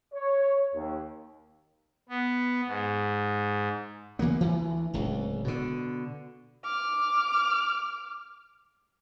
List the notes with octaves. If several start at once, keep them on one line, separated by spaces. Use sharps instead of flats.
C#5
D#2
B3
G#2
E3 F3 A#3 B3
D2 E3
D1 C#2
B2 D3
D6 F6